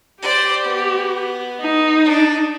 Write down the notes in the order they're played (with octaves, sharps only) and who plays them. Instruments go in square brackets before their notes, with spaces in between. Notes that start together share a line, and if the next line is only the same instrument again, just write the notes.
[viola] G4 [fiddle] C5 D5
[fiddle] B3
[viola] D#4
[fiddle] D4